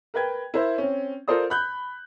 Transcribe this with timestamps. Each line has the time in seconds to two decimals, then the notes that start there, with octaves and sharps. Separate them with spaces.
0.14 A#4 B4 G5 G#6
0.54 E4 A#4 C5 E5
0.78 C4 C#4
1.28 F4 A4 A#4 C5 D5 D#6
1.50 B5 F#6 G6